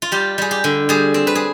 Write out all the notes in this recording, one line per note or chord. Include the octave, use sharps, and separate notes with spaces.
F4
G3 G4
G3 G#4
G4
D3
G3 G#4
C4
B4
G#4